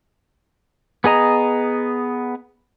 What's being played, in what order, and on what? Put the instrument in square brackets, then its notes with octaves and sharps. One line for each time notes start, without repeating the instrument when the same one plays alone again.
[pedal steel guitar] B3 G#4 D#5 A#5